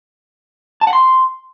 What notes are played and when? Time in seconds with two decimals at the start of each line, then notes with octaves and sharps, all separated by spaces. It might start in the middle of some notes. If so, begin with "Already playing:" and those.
0.81 A5
0.87 F#5
0.93 C6